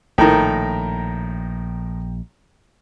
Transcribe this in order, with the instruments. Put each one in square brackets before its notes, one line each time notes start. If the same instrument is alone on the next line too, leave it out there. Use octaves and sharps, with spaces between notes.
[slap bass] A#1 [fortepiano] A2 D#3 [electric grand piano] G5 A#5